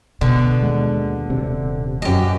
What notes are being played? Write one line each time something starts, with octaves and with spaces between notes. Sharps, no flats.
B2 D3
D#2 G#3
D#1 C3
F#2 G4 D#5